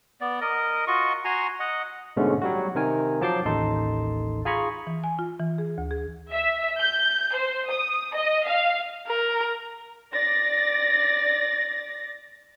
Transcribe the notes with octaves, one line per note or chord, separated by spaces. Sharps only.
B3 D5
A#4 D#5
F4 F#4 D#5 C#6
F#4 G#5 A#5 C6
D#5 F#5
G#2 B2 D3 G#3 A3 C#4
F#3 G3 F#4
C3 D#3 A#4 G#5
F3 F#3 A5 D6 G6 C7
A1 D#2 D#4 A4 A5 C6
F4 G#4 G#5 A#5 B5 C#6
E3
G#5
F4
E3
G#4
D2
G#4
E5
G6
C5
D#6
D#5
F5
A#4
D5 A6 A#6